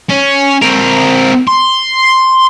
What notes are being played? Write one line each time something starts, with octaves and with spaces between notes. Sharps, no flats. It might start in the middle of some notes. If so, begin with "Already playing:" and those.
C#4
C4 A#4
C6